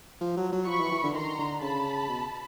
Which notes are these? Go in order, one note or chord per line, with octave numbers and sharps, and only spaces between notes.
F3
F#3
F#3
F3 B5 C#6
E3
E3
D3
D#3 A#5 C6
D3
C#3 A5 B5
B2